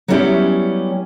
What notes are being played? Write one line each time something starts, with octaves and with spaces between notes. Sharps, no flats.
F#3 G3 B3 C#4 E4 G4